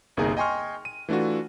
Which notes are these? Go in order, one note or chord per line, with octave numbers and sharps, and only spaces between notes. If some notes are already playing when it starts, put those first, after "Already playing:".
G1 C2 A#3 D#4 G#4 A#5
D#5 G5 G#5 C6 C#6 F6
D#7
E3 A3 D4 F4 F#4